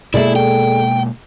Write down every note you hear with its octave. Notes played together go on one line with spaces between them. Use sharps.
B2 G#3 A#3 E4 G#4 A4 D5 E5
G5